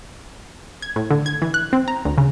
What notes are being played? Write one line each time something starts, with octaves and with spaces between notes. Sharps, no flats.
G#6
A2
D3
G#6
E3
F#6
C4
A#5
D2
C#3